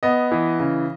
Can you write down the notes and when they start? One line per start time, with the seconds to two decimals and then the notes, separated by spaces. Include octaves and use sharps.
0.03 B3 D#5
0.32 E3
0.60 C#3